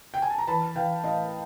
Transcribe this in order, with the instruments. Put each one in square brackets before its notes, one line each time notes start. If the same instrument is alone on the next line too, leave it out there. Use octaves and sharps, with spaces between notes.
[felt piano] G5
G#5
A5
A#5
E3 A5 B5
E3 F5 G5
A2 D#5 F5